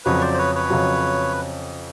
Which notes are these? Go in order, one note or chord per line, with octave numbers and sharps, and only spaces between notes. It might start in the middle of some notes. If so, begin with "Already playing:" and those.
F2 C#3 F#3 B4 C#5
C5 D5
C5
B4 C#5
B4 C#5
F2 C#3 F#3